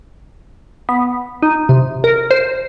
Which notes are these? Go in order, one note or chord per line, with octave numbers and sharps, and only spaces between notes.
B3
D#4
C3
A#4
C5